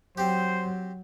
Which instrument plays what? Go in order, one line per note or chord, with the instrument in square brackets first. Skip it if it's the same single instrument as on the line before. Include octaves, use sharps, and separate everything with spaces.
[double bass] F#3 [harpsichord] C4 G4 [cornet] C5